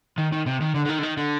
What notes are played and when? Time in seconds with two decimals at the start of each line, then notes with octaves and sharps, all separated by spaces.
0.18 D#3
0.32 D#3
0.46 C3
0.61 D#3
0.74 D3
0.85 D3
0.89 D#3
0.98 D3
1.03 D#3
1.17 D3